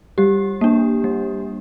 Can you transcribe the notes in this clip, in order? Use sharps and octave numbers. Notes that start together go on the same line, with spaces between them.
G3 G4
A#3 D4
G3